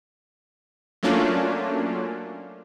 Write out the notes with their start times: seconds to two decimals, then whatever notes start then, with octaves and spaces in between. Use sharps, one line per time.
1.03 F#3 A3 A#3 C#4 D4 F4